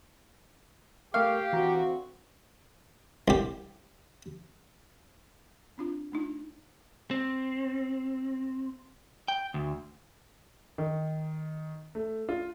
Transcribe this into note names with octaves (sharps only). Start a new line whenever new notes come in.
A3 G4 A#4 F5 C#6
D2 E3 C4 F#4 A#5
C2 G4
C4 D4 F4
A3 D4 D#4 F4
C4
G5
D2
D#3
A3
F4